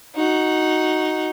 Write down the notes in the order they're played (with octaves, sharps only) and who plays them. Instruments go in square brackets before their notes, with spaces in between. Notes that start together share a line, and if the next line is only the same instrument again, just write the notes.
[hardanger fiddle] D#4 F#4